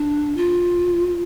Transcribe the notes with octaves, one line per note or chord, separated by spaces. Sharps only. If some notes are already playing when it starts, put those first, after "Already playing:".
Already playing: D4
F4